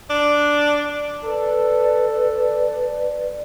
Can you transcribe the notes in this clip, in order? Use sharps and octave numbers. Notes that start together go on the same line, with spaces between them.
D4
A4 B4 D5